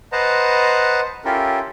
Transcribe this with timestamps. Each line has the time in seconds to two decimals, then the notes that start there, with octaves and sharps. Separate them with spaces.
0.12 B4 C5 D#5 F#5 A5 A#5
1.25 C#4 E4 F4 G4 A4 A#4